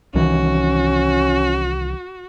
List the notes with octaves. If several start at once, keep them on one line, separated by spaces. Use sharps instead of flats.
C2 D#3 E3 C#4 F#4